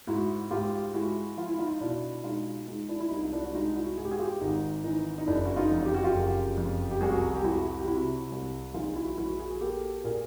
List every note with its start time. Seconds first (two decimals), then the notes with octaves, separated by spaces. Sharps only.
0.07 G#2 E4 F#4
0.51 G#2 F4 G4
0.94 G#3 E4 F#4
1.37 F3 F4
1.48 E4
1.59 D#4 F4
1.81 B2 D4 E4
2.24 G#3 D#4 F4
2.68 G#3 D#4
2.89 D4 E4
3.00 E4
3.11 C2 D#4
3.24 F4
3.32 D4 E4
3.44 F#4
3.54 G#3 D#4 F4
3.76 E4 F#4
3.97 G#2 G#4
4.05 G4
4.11 F#4 G#4
4.19 F4 G4
4.41 G#1 D#4
4.84 E3 D#4
5.18 D#4
5.27 F#1 D4 E4
5.45 F#4
5.56 D#4 F4
5.71 F2
5.85 G4
5.94 F#4
6.04 F4 G4
6.14 F#1
6.57 F2
6.91 G4
7.01 C2 F#4 G#4
7.37 G4
7.44 C2 E4 F#4
7.79 G4
7.88 C3 E4 F#4
8.31 C2
8.74 A#1 D#4 F4
8.96 E4 F#4
9.18 A#1 E4 F#4
9.39 F#4 G#4
9.51 G#4
9.61 A#3 G4 A4
10.04 A#2 G#4 A#4